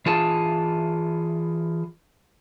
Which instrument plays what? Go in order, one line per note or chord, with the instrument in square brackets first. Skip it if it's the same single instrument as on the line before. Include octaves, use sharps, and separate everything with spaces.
[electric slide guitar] E3 F4 G#4 A5